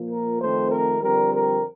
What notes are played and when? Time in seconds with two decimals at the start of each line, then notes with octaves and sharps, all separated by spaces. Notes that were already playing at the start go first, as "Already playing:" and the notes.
Already playing: A#2 F3 A#3
0.11 A#4
0.41 F2 D#3 A3 C4 C5
0.72 A#4
1.02 F2 D3 G3 C4 A#4
1.32 A#4